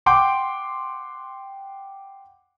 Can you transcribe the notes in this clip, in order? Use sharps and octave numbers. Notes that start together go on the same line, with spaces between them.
F#5 G5 C6 D6 G6 D7